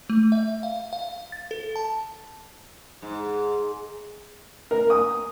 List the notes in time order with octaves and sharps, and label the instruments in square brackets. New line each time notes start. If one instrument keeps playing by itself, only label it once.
[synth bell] A3
E5
F5
F5
A6
A4
A5
[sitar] G#2
[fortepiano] A#4
D#6